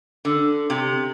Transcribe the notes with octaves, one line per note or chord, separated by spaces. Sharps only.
D3
C3